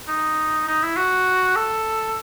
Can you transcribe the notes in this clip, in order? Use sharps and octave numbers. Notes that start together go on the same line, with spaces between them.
D#4
D#4
E4
F#4
A4